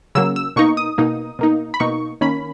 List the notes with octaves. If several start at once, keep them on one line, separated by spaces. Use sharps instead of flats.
C#3 F#3 A#3 E6
E6
B2 A#3 D#4 C#6
D#6
B2 A#3 D#4
B2 A#3 D#4
B5
B2 A#3 D#4 C#6
D#3 A#3 C#4 B5